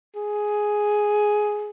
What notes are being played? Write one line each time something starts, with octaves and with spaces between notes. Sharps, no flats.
G#4